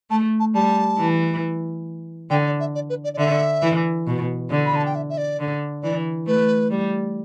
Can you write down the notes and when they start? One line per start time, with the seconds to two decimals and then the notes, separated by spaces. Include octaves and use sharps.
0.10 A3 A5
0.40 A5
0.54 G3 A5
0.99 E3
2.30 D3 G5
2.45 D5
2.59 E5
2.75 D5
2.89 B4
3.04 D5
3.14 D5
3.18 D3 E5
3.63 E3
4.07 B2
4.50 D3
4.65 B5
4.76 A5
4.85 G5
4.95 E5
5.09 E5
5.17 D5
5.39 D3
5.82 E3 D5
6.26 A3 B4
6.70 G3